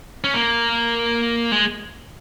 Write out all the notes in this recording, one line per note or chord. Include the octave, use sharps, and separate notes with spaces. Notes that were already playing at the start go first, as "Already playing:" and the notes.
C#4
A#3
G#3